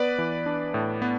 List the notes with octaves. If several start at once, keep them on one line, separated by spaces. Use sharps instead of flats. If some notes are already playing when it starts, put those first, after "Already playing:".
Already playing: B3 B4 D5
E3
D4
A2
B3